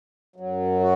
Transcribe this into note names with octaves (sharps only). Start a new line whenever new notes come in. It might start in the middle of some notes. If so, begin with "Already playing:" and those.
F#2 F#3
F#4